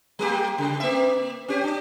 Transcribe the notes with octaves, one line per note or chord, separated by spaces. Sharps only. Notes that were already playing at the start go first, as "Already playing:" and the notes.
G3 A#3 G4
C#3
A#3 E5
C#4 G4
D4